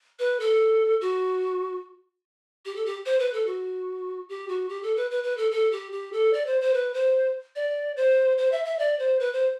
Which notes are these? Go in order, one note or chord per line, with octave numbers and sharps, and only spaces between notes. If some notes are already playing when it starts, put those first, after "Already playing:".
B4
A4
F#4
G4
A4
G4
C5
B4
A4
F#4
G4
F#4
G4
A4
B4
B4
B4
A4
A4
G4
G4
A4
D5
C5
C5
B4
C5
D5
C5
C5
E5
E5
D5
C5
B4
C5